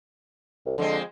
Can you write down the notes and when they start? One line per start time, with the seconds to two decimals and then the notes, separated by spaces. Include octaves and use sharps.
0.66 C2
0.78 F2 D3 G#3 C4